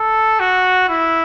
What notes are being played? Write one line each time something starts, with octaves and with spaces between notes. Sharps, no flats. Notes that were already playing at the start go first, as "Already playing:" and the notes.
Already playing: A4
F#4
E4